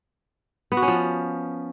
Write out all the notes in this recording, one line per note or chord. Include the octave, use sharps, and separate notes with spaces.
B3
F#4
C#4
F3